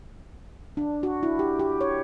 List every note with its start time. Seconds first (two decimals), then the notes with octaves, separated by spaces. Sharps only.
0.77 D4
1.03 F#4
1.23 E4
1.39 G4
1.59 G4
1.81 C#5